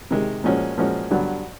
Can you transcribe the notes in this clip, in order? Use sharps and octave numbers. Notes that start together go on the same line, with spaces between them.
C3 D#3 G#3
A#2 F3 G#3 C#4 F#4
A#2 F3 G#3 C#4 F#4
G2 D3 F#3 B3